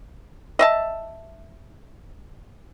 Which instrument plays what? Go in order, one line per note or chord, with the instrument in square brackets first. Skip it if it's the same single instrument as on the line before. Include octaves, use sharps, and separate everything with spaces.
[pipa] D#5 E5 A5